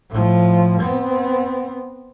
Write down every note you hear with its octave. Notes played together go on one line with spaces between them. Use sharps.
A2 F3
B3 C4